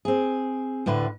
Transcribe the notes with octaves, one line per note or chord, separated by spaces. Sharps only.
C4 G#4
D2 A2 D3 B4